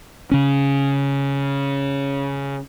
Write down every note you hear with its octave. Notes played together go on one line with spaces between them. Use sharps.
C#3 C#4